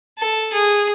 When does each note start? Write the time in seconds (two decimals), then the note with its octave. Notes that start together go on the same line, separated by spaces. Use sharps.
0.18 A4
0.53 G#4